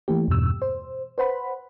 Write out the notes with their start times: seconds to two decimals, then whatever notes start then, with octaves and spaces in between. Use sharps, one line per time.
0.08 E3 A3 A#3 G4
0.28 E2 G2 B2 E6
0.62 C5
1.18 B4 C5 F#5 B5